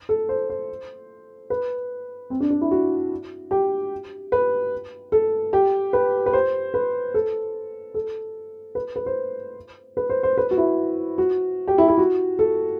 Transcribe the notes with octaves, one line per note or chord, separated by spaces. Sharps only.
A4
C5
C5
B4
C4
D4
D4
E4
F#4
G4
B4
A4
G4
B4
B4
C5
B4
A4
A4
B4
B4
C5
B4
C5
C5
B4
F#4
E4
F#4
G4
E4
E4
F#4
A4